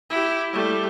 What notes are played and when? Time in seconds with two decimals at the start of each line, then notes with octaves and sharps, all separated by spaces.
0.10 E4 G4
0.53 G3 A3